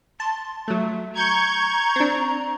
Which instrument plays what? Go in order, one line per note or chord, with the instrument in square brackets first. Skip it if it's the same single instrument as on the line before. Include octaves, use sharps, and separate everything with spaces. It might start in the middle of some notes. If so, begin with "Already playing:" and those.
[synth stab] A5 [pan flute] C6
[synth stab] F#3 A3 [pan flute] E5
[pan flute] A#5 [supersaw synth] C#6 G6 G#6
[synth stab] C4 D4